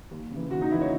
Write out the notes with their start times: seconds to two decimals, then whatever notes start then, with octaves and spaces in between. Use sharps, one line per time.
0.11 D#2
0.31 C#3 E3
0.51 D#2 F#4
0.61 D#4
0.71 C#3 E3 E4
0.81 C#5